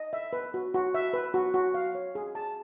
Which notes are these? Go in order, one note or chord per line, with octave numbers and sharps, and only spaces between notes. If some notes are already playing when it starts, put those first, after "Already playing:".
Already playing: D#5
E5
B4
F#4
F#4
E5
B4
F#4
F#4
F5
C#5
G#4
A5